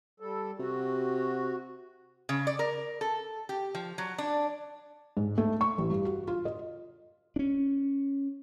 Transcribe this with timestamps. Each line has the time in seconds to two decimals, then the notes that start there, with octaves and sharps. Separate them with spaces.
0.20 G3 A4
0.60 C3 F#4
2.29 C#3
2.47 D5
2.59 A#4
3.01 A4
3.49 G4
3.75 F3
3.98 F#3
4.18 D4
5.17 G#2
5.38 A3
5.61 C#6
5.78 A1
5.91 G2
6.05 F#4
6.28 F4
6.45 D#5
7.36 C#4 D4